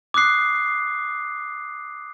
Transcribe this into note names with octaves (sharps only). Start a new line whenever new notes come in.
D6 D#6 F#6 C7